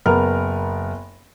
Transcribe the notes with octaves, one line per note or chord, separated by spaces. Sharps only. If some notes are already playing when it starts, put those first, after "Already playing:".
F#1 B3 A#4 F6